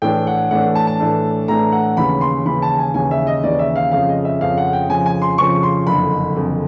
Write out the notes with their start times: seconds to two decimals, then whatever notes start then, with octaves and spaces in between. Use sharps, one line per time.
0.02 A2 E3 A3 D4 G5
0.27 F#5
0.51 A2 E3 A3 D4 F#5
0.75 A5
0.87 A5
1.00 A2 E3 A3 D4
1.48 A2 E3 A3 D4 A#5
1.72 F#5
1.96 D#2 C#3 E3 B5
2.21 C6
2.45 D#2 C#3 E3 B5
2.62 A5
2.79 G#5
2.94 D#2 C#3 E3 G#5
3.11 E5
3.27 D#5
3.43 D#2 C#3 E3 D5
3.59 E5
3.76 F5
3.92 F2 C#3 F3 F5
4.09 D#5
4.25 E5
4.40 F2 C#3 F3 F5
4.58 F#5
4.73 G5
4.89 F2 C#3 F3 G#5
5.06 G#5
5.22 C6
5.38 F2 C#3 F3 C#6
5.63 C6
5.87 F#1 F2 D3 B5
6.36 F#1 F2 D3